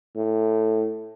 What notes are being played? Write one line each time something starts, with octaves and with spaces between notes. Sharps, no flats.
A2